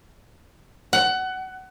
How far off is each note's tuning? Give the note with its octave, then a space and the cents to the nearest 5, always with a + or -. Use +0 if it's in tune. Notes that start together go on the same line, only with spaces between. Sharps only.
F#5 +20